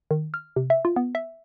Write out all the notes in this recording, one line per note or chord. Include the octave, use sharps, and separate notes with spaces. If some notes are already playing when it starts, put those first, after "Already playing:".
D#3
F6
C3
E5
F4
B3
E5